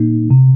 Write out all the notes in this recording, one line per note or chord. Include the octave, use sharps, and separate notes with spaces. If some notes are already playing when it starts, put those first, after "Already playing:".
Already playing: A#2 A#3 D#4
C3